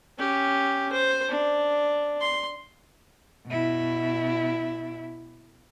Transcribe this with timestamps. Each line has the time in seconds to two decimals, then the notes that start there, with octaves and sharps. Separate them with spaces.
0.18 C#4 G4
0.92 C5
1.29 D4
2.21 C6
3.47 B2 E4